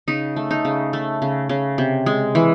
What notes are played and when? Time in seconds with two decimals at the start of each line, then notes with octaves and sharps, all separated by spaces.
0.08 C#3 D#4
0.36 A3
0.51 D#4
0.65 C#3
0.93 A3
1.22 C#3
1.49 C#3
1.78 C3
2.06 G#3
2.35 E3